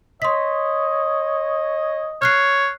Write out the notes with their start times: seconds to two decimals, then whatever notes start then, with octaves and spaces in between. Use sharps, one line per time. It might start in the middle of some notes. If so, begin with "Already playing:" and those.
0.22 C#5 D#5 C6 B6
2.22 C#5 F6 F#6 C7